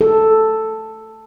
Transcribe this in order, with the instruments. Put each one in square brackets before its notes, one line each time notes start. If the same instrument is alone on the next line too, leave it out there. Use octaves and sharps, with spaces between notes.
[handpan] A4